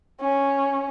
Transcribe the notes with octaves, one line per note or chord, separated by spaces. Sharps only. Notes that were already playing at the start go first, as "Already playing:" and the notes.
C#4